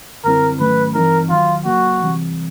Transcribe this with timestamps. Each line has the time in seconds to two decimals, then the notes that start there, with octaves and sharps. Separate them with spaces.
0.24 F#2 D3 G3 C4 E4 A#4
0.60 G#2 D#3 F#3 A3 C#4 B4
0.94 G2 E3 G3 C4 D#4 A#4
1.30 D#2 D#3 F#3 F4
1.65 C#3 F#3 A#3 F#4
2.00 D2 C3 E3 G3 C4